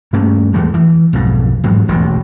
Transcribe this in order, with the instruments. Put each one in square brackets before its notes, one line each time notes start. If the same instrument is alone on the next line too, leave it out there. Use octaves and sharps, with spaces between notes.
[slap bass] G2 A3 A#3 C#4
E2 E3 G#3 A3
E3
B1 F2 G#2
A1 G#2 F#3
E1 A1 D#2 B2